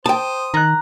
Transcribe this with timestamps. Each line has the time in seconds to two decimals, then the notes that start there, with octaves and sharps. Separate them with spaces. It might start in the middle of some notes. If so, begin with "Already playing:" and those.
0.06 C5 G5 A5 D#6
0.54 D#3 A#5 F#6